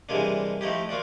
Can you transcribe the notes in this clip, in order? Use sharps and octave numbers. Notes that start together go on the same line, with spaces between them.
C3 E3 G3 G#3 A#3 D4
F3 A3 D#4 E4 G4
A#3 F4 F#4 D5